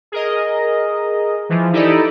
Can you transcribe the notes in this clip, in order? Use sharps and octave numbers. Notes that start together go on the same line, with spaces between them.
G#4 A#4 D#5
E3 F3
D#4 E4 G4 A4 D5 D#5